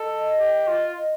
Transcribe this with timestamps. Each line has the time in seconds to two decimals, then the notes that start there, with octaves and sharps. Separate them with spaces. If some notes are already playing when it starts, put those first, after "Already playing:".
Already playing: A4 D#5
0.40 G4
0.68 F4
0.97 D#5